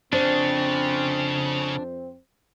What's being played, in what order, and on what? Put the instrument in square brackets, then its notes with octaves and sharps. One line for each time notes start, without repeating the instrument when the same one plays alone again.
[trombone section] F2 C4 [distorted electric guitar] C#3 [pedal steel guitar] D4 [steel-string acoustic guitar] C5